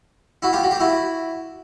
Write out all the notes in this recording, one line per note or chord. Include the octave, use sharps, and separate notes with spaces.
E4 F#4
F4 G4
F#4
G4
E4 F#4